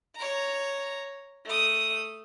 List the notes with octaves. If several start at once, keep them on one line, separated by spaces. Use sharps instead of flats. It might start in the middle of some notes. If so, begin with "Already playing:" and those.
C#5 A#5
A3 D#6